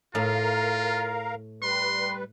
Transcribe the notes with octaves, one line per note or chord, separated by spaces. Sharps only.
A2 F4 A#4 F5 A#5
G3 B4 C6